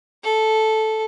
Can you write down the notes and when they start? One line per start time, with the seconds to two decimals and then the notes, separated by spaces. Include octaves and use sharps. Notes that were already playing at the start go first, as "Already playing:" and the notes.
0.24 A4